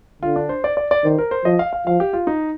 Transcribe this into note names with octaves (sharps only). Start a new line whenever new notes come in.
D3 F4
D4
C5
D5
D5
D5
D#3 C5
A#4
C5
F3 D#5
F5
F5
F3 F5
G4
F4
D#4